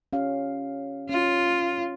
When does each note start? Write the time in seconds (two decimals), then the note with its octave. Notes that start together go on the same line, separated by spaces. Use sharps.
0.13 C#4 G4 F5
1.09 C#4 F4